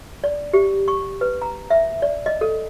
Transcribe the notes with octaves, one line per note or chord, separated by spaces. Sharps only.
D5
G4
C#6
B4
A#5
E5
D5
D#5
A4